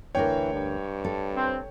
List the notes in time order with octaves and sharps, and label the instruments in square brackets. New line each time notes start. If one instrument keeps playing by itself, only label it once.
[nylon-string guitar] D2 D4 A#4 [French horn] E3 [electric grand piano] C#5 G5
[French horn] G2
[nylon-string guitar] A4
[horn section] C4